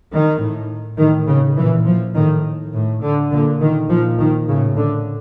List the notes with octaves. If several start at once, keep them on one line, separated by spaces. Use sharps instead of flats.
D#3
A2
A2 D#3
C#3
A#2 E3
F3
A2 D#3
A2
D3
A#2 D3
D#3
A#2 F3
D#3
A2 C#3
D3